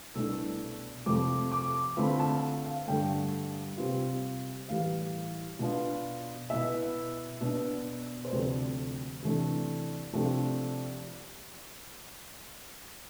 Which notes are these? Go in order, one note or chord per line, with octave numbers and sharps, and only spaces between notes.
C2 B2 A3 D4 E6
F2 C3 F3 A3 D6
D6
D3 A3 C4 F4 B5
A5
F5
G2 D3 A3 G5
C3 G3 C4 F4
A2 E3 G3 F5
B2 B3 D4 F4
B2 B3 E4 E5
B2 B3 D4
C5
D2 C3 F3 A3 C4 D5
C3 E3 A3 D4
C3 F3 A3 D4